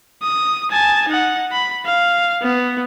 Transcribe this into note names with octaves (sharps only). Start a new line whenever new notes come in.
D#6
G#5 A5
D#4 F#5
B5
F5
B3